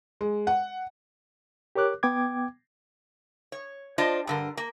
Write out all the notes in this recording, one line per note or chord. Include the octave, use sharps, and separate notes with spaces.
G#3
F#5
G4 A#4 C#5 D6 F#6
B3 G5 D6 G#6
C#5
D4 F4 C5 D#5
G2 D3 A#4
A#3